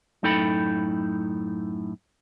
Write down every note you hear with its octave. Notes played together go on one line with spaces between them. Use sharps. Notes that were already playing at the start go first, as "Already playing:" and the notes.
F#2 A2 D#4 A4 G5 B5